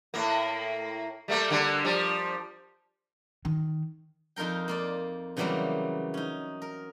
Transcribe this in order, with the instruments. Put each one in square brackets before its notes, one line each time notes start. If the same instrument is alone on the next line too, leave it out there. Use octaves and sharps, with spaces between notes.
[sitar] A2 A#3
G3 A3 A#3
D3 G3 A#3
F3 G3
[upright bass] D#3
[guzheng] F2 D#4 F4 A#4 G5
A#3 F4 D5
C#3 E3 F#3 G3 A#3 C4
C#4 D#4
A#4